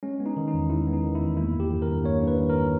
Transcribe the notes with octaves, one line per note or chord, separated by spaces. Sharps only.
G#3 C#4
B3
D#4
D#3
D#4
E2
G#3 E4
B3
D#4
D#3
E4
E2
A#3 E4
G2
G4
D#3
A#4
G2
A#3 C#5
G2
B4
D#3
A#4